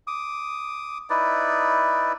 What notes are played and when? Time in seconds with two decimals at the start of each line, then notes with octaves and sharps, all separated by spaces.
0.07 D6 D#6
1.10 D#4 E4 B4 D5